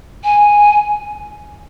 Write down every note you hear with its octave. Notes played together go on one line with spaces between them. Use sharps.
G#5